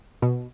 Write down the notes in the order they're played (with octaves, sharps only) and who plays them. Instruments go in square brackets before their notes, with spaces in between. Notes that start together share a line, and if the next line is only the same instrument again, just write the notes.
[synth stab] B2